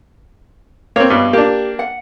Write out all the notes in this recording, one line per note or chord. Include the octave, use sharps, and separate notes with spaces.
A#3 C4 C#5
G2 B2
A#3 D4 G4
F#5